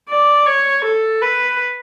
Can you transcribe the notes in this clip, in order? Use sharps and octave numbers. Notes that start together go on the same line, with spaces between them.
D5
C#5
A4
B4